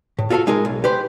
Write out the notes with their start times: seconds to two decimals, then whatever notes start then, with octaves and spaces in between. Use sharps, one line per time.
0.19 A2
0.30 F4 F#4 A4 B4 F5
0.47 G#3 D#4 G#4 A#4
0.65 B1
0.84 G4 B4 C5